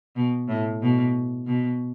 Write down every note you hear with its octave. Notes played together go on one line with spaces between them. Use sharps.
B2
A2
B2
B2